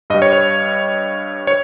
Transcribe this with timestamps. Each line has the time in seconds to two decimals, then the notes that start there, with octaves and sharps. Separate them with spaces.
0.10 G2 D#5
0.14 G3
0.22 C#5
0.33 C#5
1.47 C#5